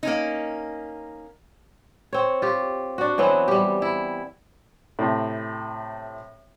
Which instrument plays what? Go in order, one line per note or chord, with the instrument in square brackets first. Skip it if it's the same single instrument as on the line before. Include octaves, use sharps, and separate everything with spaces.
[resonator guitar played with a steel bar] A#3 C#4 D#4
[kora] C4 C#5
F4 G4
D4 F#4
E3 F#3 B3 C4
G3 G4
E4
[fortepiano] A2 C3